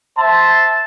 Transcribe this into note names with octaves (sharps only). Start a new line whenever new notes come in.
C5 E5 A5 C6